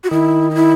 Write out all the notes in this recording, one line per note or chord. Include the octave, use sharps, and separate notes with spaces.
F#4
D#3 E4
D#4
E4